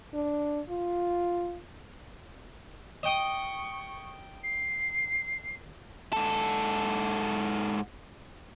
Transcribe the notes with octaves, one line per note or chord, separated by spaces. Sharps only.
D4
F4
D#5 G5 C#6 D#6
C7
G#2 A4